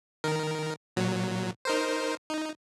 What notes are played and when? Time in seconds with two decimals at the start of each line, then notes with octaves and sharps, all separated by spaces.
0.24 D#3 A#4
0.96 A#2 F#3
1.65 D#4 A#4 C5
2.30 D#4